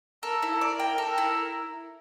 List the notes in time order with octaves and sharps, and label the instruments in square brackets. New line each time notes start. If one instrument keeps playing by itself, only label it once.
[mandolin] A4 [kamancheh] A#4
[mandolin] E4
[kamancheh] A#4
[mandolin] D5
G5
A4
E4